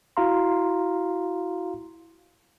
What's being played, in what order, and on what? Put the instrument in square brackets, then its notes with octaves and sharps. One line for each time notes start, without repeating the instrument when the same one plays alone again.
[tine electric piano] E4 F#4 F5 A#5 C6